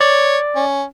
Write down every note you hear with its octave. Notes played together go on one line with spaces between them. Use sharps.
C#5 D5
C#4